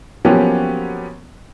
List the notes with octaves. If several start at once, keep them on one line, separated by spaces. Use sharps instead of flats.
F3 F#3 A#3 B3 C#4 G4